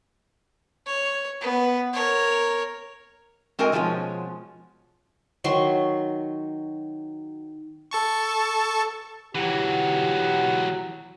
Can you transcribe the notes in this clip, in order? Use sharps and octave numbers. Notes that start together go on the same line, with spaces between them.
C#5
B3
A#4 C#5
G#3 C4 F#4 A#4 D#5 G#5
B2 F3 G#3 A3 C#4
D#3 F#3 C6 C#6
A4 A5 C#6
E3 F#3 G4 F#5